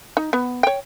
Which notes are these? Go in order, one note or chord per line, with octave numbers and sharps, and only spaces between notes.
D#4
B3
C#5 G5